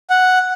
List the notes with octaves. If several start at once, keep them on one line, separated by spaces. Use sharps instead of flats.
F#5